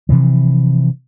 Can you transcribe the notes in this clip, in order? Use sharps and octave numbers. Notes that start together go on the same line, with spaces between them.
C3 E3 F3